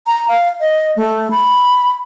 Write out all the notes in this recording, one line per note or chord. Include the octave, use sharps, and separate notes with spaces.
A#5
F5
D#5
A3
B5